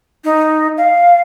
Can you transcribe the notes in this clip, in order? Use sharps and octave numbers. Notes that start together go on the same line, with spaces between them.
D#4
F5